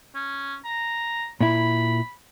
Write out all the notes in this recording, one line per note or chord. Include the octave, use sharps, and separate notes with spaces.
C#4
A#5
A#2 E4 B5